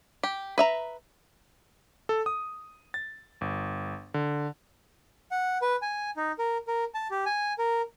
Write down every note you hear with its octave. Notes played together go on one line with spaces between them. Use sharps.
G4
B4 E5 A#5
A4
D#6
A6
G1
D3
F#5
B4
G#5
D#4
A#4
A#4
A5
G4
G#5
A#4